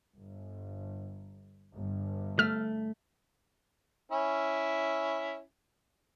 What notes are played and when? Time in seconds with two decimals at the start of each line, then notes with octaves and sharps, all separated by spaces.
0.16 G1
1.73 G1 G2
2.39 A3 F6
4.12 C#4 E4